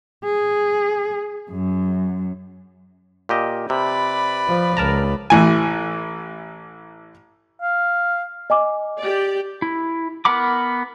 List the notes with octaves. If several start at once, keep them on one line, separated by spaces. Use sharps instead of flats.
G#4
F#2
A#2 G4 D#5
C3 B4 D5 B5
F3
C#2 A#4 A5 A#5
A1 E3 G#5
F5
D#5 G#5 D6
G4 D5
E4
B3 A#4 F#5 B5 D6